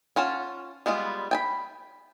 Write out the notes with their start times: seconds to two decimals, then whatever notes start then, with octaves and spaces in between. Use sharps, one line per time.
0.16 C#4 F4 F#5 A5
0.86 G3 G#3 B3 F4
1.31 G5 G#5 B5